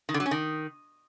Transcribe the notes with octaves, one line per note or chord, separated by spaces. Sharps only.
D#3
D3
F#3
C#4
D#3